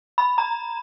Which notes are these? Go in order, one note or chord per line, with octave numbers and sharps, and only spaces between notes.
B5
A#5